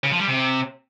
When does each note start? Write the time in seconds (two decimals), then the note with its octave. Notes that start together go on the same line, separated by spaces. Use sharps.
0.04 C#3
0.12 F3
0.20 G3
0.28 C3